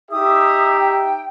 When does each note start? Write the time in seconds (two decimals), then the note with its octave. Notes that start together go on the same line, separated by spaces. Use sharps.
0.11 D#4 G4 E5 D#6
0.70 G5